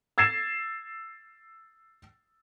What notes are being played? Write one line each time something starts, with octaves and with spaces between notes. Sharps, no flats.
E6 G#6 A6 C7 E7